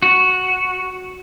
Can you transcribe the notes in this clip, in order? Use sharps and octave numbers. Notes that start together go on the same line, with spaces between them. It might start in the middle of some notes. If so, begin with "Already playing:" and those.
F#4